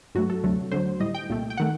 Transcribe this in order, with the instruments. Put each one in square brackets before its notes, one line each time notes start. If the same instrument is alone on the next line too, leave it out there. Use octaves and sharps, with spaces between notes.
[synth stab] G2 F#3 A3 F#4
A4
D2 C3 F#3 A3
D2 D3 F#3 C5
A2 G3 D#5
G5
C2 A#2 A3
G5
D#3 A3 F#5